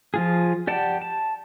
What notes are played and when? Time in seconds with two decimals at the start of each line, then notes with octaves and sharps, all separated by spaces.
0.14 F3 F4 G#4
0.67 G4 D5 F#5 G5 A5
1.02 A5